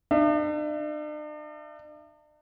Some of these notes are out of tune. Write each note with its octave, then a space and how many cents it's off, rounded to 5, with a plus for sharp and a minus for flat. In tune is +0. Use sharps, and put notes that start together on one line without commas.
D4 +45 E5 +30